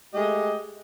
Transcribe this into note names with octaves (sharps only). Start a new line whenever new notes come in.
G#3 A3 G4 D#5